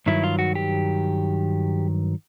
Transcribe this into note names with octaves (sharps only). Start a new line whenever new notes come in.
G2 D#3 F#3 E4
F4
F#4
G4